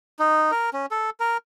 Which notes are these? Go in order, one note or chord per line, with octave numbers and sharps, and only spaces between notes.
D#4
A#4
C#4
A4
A#4